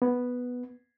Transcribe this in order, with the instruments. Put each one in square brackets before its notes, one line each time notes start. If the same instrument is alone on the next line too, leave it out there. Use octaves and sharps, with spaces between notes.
[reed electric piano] B3